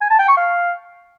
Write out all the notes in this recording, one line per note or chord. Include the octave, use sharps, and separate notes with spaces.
G#5
A5
G5
C#6
F5